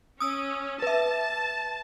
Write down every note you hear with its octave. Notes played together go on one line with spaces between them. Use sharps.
C#4 D#6 E6
B4 E5 A5